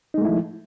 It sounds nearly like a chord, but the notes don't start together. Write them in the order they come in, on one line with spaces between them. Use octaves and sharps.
D#4 G#3 A3 E4 F3